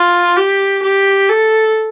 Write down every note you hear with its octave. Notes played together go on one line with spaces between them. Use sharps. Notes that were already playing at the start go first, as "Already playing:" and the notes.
Already playing: F4
G4
G4
A4